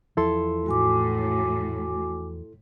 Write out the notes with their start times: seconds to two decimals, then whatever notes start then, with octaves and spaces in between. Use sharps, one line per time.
0.17 E2 F3 E4 A4 C6
0.66 A2 F#4 G#5 D6